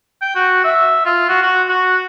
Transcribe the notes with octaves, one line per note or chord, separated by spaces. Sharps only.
G5
F#4
E5
F4
F#4
F#4
F#4